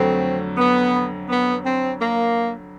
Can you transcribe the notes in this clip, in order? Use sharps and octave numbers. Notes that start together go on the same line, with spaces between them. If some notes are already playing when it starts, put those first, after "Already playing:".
Already playing: F2 D3 F#3 A3 C4
B3
B3
C4
A#3